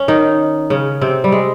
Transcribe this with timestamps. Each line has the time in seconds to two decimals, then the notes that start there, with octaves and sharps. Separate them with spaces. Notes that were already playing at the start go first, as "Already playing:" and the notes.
Already playing: C#4
0.08 D#3 D#4
0.70 C#3 C#4
1.01 C3 C4
1.24 G3
1.32 G#3